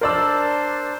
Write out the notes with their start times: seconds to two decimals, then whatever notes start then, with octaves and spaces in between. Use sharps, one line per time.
0.01 D4 A#4 C5 D5 C6 E6